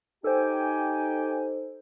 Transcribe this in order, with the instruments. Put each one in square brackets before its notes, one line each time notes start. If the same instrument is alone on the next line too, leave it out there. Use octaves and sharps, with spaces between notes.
[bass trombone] D#4 [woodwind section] G4 G5 G#5 [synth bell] A4 C5